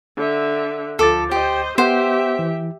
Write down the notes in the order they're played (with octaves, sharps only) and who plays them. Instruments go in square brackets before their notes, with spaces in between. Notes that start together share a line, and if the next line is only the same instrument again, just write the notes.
[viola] D3 E5
[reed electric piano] D2 D6 A6 [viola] F3 [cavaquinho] A4
[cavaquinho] G4 [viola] C5 D#5
[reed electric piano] B3 F#5 [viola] G4 E5 [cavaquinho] C5
[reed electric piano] E3